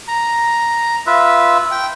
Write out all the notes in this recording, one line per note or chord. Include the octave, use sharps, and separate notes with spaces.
A#5
F4 B4 E5
G5